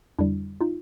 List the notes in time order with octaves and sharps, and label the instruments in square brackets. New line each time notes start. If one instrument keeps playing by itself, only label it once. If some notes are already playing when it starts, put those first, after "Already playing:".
[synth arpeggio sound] F2 D3 G3 D4 E4
D#4 F4